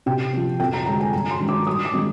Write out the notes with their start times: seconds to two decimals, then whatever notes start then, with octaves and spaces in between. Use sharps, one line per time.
0.06 C3 G5
0.33 F3 C4
0.60 F2 G5
0.73 A#5
0.86 D3 G#3 A#5
1.00 G#5
1.13 G2 A#5
1.31 C6
1.40 D#3 G#3 D4
1.49 D6
1.67 G2 D#6
1.85 D6
1.93 D#3 G#3 C4